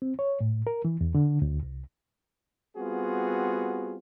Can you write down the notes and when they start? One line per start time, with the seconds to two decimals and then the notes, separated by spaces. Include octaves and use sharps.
0.02 C4
0.19 C#5
0.40 A2
0.67 A#4
0.85 E3
1.01 E2
1.15 D3
1.42 D2
1.63 C2
2.77 G3 B3 C4 F4 F#4 G#4